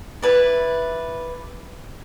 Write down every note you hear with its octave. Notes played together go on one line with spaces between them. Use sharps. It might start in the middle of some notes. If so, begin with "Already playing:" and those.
E4 B4 D5